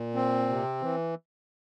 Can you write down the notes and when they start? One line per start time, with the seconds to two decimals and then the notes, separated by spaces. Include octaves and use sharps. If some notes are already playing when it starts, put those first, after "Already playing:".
Already playing: A#2
0.15 C4
0.49 C3
0.81 E3